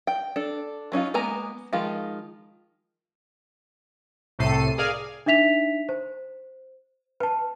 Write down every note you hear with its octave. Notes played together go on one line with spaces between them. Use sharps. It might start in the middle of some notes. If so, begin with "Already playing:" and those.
G5
D4 A4
F#3 C#4 D#4 F4
G#3 A#3 B3 G#5 A#5
D#3 F3 G#3 F4
C2 A2 C3 A4 C7 D#7
G#4 A#4 D5 F5 G#5
D4 D#4 E5 B6 F7
C5
B4 A5